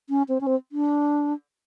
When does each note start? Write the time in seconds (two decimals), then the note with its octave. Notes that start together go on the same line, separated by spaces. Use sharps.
0.10 C#4
0.28 C4
0.41 C#4
0.47 C4
0.72 D4